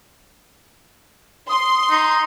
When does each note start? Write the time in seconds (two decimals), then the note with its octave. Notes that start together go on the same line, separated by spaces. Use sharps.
1.49 C6 D#6
1.90 D#4